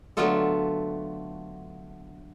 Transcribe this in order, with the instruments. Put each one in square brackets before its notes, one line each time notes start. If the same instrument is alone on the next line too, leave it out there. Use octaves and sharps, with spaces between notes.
[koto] D3 F#3 A3 B3 F4 A4